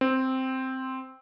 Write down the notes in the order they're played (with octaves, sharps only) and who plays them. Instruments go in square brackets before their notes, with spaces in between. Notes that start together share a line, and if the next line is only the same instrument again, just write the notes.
[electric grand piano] C4